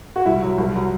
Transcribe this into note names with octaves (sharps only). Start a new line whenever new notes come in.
F#4
C2 E4
F#3
C2
F#3